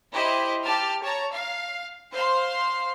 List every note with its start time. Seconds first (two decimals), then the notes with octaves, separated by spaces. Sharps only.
0.13 E4 G4 C5 D#5
0.65 G4 A5 F6
1.03 C#5 A5 A#5
1.33 F5
2.12 C5 F5 C6